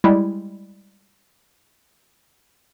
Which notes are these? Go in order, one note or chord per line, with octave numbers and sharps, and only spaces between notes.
G3 G#3 E4